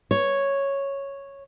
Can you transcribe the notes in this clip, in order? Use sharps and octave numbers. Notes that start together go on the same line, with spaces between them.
C#5